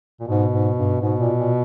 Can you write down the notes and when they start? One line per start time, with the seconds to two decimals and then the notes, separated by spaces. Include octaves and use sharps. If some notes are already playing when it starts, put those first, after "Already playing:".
0.20 A#2
0.28 G#2 B2
0.52 G#2
0.77 G2
1.01 G#2 B2
1.19 A#2
1.38 A#2